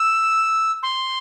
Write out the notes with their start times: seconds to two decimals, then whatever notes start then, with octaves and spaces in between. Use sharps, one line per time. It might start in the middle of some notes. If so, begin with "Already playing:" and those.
Already playing: E6
0.83 C6